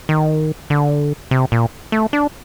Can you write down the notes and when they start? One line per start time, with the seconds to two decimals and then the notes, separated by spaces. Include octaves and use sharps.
0.09 D#3
0.70 D3
1.31 C3
1.52 A#2
1.92 A3
2.13 D4